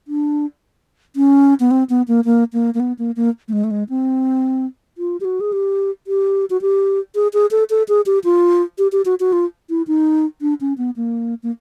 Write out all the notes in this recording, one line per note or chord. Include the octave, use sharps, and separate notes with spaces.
D4
C#4
B3
C4
B3
A#3
A#3
A#3
A#3
B3
A#3
A#3
A3
G#3
A3
G#3
C4
F4
G4
F#4
G#4
G4
G4
F#4
G4
G#4
G#4
A4
A4
G#4
G4
F4
G4
G4
F#4
F#4
F4
E4
D#4
D4
C#4
B3
A#3
A#3